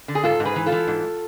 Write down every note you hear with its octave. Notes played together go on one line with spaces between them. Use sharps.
D3
G#4
G#2 F4 A4
G#2
G#4 B4
E3
F4 A4
E3
G#2